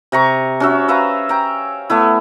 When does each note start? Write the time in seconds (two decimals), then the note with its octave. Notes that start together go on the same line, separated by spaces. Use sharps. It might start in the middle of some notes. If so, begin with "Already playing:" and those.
0.12 C3 A#5 C#6
0.60 C#4 F#4 E5
0.88 B4 E5 F5 A#5
1.29 G5 A#5
1.90 A3 B3 E4